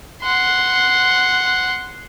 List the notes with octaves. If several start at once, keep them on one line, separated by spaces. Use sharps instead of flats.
F#5 C6